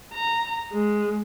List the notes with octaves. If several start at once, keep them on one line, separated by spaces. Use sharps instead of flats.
A#5
G#3